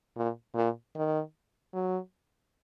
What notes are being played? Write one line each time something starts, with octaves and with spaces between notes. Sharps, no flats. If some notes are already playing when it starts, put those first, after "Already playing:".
A#2
A#2
D#3
F#3